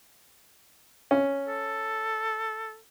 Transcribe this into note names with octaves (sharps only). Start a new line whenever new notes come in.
C#4
A4